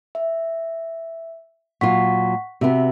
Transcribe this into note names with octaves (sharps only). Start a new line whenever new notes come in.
E5
A#2 F#3 F4 F#5 C#6 B6
C3 B3 F#4 E5